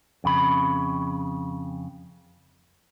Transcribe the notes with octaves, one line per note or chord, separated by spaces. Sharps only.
F2 C#3 B5